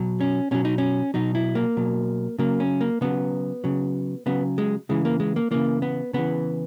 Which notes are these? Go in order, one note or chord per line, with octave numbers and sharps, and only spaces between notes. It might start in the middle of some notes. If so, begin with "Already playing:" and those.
Already playing: B2 F#3
C#4
B2 F#3 C#4
D#4
C#4
B2 F#3 D#4
E4
A#3
B2 F#3
C#3 F#3 A#3
C#4
A#3
C#3 F#3 B3
C#3 F#3
C#3 F#3 B3
G#3
C#3 E3 G#3
A#3
G#3
A#3
C#3 E3 A#3
B3
C#3 E3 B3